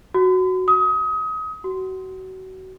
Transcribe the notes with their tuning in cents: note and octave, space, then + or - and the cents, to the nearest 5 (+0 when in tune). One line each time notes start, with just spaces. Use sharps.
F#4 +5
D#6 +30
F#4 +30